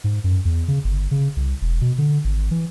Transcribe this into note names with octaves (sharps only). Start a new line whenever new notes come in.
G#2
F#2
E2
C#3
G1
C#3
C2
E1
B2
D3
G#1
E3